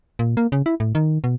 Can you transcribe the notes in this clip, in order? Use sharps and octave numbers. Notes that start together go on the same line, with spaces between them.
A#2
A#3
C#3
E4
A2
D#3
B2